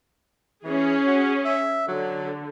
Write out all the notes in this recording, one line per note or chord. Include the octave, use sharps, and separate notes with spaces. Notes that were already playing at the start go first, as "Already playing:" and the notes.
E3 C#4 G#4
F#4
E5
D3 F#3